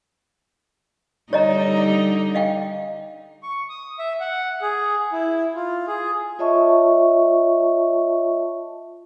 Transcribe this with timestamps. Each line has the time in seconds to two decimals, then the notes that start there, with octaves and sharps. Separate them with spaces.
1.33 D3 G3 D#4 C#5 D#5 A#5
2.35 D#5 F5 G5
3.43 C#6
3.69 D#6
3.99 E5
4.20 F#5
4.62 G#4
5.13 E4
5.55 F4
5.88 G#4
6.39 F4 C#5 D#5 E5 A5 C#6